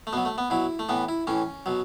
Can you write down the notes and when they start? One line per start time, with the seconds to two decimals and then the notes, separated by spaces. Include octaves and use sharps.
0.07 A3
0.13 B2 F#3 B3
0.25 A3
0.38 B3
0.50 B2 F#3 E4
0.79 A3
0.89 A2 E3 B3
1.09 E4
1.27 A2 E3 C#4
1.66 B2 F#3